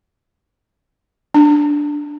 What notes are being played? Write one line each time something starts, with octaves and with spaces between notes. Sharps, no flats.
D4